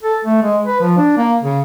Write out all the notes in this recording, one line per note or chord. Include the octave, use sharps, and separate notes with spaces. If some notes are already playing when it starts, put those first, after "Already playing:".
A4
A3
G#3
B4
F3
D4
A#3
C#3